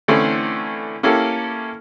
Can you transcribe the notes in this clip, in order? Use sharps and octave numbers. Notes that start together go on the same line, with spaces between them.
D3 E3 A3 C4 C#4 E4
A#3 C#4 E4 G4 A4